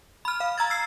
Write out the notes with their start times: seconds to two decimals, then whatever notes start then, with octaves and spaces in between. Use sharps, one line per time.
0.25 B5 F6
0.40 F5
0.58 A#5 E6 G#6 A6
0.70 E6 C7